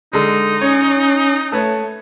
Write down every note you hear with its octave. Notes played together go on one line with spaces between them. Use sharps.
D3 G#3 D#4
C#4 C#5
A3 A4 B4 C#5